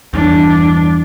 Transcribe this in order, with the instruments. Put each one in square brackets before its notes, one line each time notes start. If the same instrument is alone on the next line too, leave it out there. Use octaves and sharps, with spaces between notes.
[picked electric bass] E2 G2 E3 [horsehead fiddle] D4